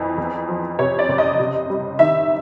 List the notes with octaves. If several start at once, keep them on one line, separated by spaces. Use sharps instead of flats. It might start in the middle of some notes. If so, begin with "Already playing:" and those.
Already playing: F2 E3
E2
F3
C3 C#5
D5
F#1
D#5
C3
G3
D#3 E5